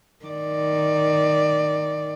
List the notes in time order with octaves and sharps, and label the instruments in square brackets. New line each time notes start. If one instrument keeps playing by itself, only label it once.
[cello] D#3 D5